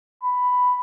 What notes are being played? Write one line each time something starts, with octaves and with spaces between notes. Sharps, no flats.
B5